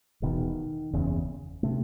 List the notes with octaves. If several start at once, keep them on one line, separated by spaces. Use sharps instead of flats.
E1 E2 B2 D#3
F#1 E2 C#3
C3 A3